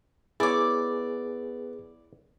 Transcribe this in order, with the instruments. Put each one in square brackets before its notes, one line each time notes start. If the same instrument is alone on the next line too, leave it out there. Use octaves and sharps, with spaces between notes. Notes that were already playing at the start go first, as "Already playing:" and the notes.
[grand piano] B3 [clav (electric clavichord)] E4 C#5 [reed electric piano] G#4 [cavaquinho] D5 D6